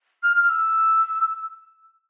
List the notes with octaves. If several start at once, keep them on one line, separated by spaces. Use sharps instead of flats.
F6
F6
E6